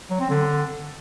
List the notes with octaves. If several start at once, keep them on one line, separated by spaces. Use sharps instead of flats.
F#3
C4
D3